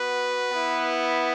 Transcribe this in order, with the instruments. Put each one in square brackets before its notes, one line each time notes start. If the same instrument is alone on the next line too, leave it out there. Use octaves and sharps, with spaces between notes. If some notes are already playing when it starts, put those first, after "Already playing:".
Already playing: [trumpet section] B3 F#4 B4
B3 E4